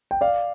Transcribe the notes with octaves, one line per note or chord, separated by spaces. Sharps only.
G5
D5 F5